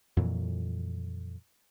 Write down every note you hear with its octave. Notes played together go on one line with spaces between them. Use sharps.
F2 A#2 E3 F#3